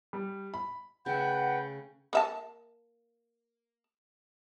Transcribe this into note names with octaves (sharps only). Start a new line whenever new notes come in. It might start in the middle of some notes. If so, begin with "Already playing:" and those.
G3
B5
C#3 A3 B4 F#5 G5
A#3 E5 A5